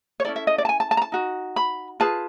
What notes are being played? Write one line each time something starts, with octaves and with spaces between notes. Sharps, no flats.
C#5
C#4 E4 A4 D5
E5
D#5
D5
A5
G#5
A5
A5
A#5
A5
D#4 F#4
B5
F4 G#4 B4 A5